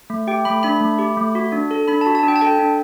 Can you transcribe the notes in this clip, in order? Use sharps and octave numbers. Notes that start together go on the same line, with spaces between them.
A3
G4 G5
A3 B5
D4 B5
A3
G4
A3
F#4
D4
A4
D4 B5
A5
F#4
A5
D4 G5
A5
A4 G5
D4